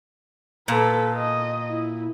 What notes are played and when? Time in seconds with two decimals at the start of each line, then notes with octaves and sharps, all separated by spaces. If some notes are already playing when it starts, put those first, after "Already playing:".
0.68 A#2 A4 B4
1.15 D#5
1.69 E4